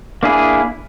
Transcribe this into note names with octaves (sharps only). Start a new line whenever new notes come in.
A#3 D4 E4 G#4